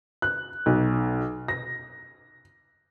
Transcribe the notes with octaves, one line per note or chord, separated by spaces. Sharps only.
F#6
B1
A#6